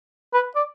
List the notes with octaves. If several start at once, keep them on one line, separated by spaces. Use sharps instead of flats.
B4
D5